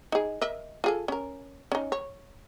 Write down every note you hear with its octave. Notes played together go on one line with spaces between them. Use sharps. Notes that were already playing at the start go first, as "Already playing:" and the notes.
D#4 G#4
A#4 D#5 E5
F4 G#4 A4
C#4 A#4
C#4 D#4
C#5